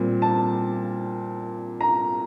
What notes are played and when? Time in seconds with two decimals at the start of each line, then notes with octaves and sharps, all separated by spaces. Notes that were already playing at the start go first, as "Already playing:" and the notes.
Already playing: A#2 G3 C4
0.22 A5
1.81 A#5